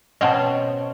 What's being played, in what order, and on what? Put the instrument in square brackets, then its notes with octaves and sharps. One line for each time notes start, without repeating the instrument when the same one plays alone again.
[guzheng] B2 C4 C#4 [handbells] D#5 F#5 A5